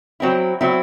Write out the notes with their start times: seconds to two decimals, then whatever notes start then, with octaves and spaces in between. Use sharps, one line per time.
0.20 F#3 C4 E4
0.61 F#3 C4 E4